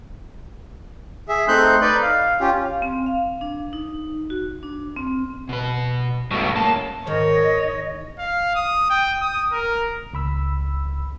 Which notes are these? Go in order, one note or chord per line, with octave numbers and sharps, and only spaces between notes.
G#4 E5
A3 C4 D#4 C6 F#6 G6
D#4 B4 D5 G6
F5
C#4 F4 G4
F5
C4
F5
D4
D#4
F#4
D4
C4
B2 B4
C#2 G2 B2 A3
A#3 C#4 A5
G#2 D#3 C#5 D#5
F5
D#6
G5
D#6
A#4
C#2 B5 E6